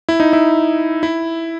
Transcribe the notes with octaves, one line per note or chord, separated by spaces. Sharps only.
E4
D#4
E4
E4